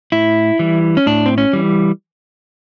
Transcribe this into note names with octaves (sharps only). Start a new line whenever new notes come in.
A2 E4
E3 G3
C#4
A2 D4
C4
C#4
E3 G3